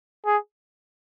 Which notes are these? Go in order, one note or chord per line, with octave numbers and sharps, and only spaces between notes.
G#4